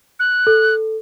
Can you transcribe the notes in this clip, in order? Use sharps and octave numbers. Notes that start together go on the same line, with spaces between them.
F#6
A4